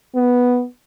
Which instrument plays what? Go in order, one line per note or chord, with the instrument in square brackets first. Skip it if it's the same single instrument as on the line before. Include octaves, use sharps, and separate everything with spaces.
[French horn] B3